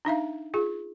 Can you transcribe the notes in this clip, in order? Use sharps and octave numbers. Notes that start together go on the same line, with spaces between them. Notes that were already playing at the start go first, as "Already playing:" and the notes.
D4 D#4 E5 F5
F4 G#4